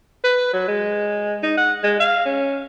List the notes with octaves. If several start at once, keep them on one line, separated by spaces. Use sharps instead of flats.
B4
F#3
G#3
D#4
F#5
G#3
F5
C#4